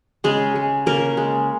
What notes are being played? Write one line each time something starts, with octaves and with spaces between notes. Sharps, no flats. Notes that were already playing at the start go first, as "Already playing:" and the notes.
C#3 G#3 G#4
G#3
C#3 A#3 A#4
G#3